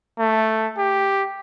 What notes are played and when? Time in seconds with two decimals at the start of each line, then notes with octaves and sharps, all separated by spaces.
0.19 A3
0.77 G4